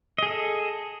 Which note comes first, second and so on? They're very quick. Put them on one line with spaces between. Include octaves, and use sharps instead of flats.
D#5 G#4 A4